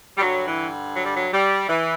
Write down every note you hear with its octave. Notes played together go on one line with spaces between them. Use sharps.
G3
G2 D3 F#3
E3
F#3
G3
F#3
G3
E3